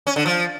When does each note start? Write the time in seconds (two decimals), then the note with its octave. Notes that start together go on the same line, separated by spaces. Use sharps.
0.07 C#4
0.16 D3
0.26 F3